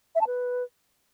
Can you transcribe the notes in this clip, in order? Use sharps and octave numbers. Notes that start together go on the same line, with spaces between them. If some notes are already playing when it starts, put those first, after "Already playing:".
E5
A5
B4